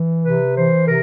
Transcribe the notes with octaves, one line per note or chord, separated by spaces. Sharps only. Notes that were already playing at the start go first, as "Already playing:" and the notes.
Already playing: E3
C3 B4
E3 C5
C3 A#4